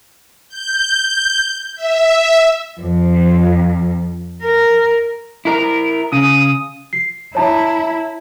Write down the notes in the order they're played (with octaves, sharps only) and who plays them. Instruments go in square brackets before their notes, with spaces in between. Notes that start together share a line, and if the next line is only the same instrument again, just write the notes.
[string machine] G6
E5
[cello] F2
A#4
[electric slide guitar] E4 A#4
[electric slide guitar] C#3 [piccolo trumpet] D#6
[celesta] C7
[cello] E4 [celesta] C#5 A5 A#5